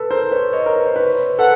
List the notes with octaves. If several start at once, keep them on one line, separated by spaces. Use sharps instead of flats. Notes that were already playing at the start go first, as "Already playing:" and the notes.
Already playing: A4 B4
A#4 C5
B4 C#5
C#5 D#5
A#4
B4
C5
B4 C#5
A4 B4 F#5